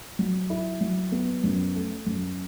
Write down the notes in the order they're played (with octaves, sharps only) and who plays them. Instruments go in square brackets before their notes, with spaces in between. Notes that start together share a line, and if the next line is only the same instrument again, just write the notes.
[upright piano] F#3
E4
F#3
B3
F#2
A3
F#2